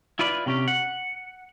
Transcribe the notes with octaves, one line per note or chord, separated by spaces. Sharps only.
E4 F4 B4 D5
C3 C#4 G4
F#5